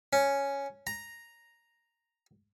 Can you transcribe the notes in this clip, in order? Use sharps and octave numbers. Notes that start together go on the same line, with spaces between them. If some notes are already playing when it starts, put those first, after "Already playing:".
C#4
A#5